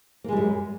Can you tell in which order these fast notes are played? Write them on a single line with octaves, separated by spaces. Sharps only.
A#3 G#3 G3 F#2